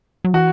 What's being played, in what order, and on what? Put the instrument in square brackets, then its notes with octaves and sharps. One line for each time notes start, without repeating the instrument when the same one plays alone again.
[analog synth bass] F#3
[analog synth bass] E3 [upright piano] F#4